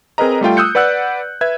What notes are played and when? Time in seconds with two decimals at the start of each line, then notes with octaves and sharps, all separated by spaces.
0.18 C4 G#4 A#4 B4 D#5 A#5
0.41 G3 A3 F4 G5
0.57 D#6 E6 F#6 G6 C#7
0.75 B4 D5 F#5 E6 F#6
1.41 B4 E5 G#6